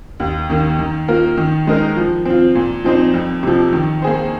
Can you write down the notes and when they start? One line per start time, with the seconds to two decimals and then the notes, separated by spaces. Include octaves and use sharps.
0.20 D#2
0.50 D#3 A#3
0.79 D#3
1.08 A#3 F4 A#4
1.37 D#3
1.67 G#3 D#4 A#4
1.97 F3
2.25 C4 F4
2.55 A#2
2.84 F3 C4 D#4 C5
3.14 F2
3.43 C3 F3
3.73 D#3
4.02 A#3 G#4 C5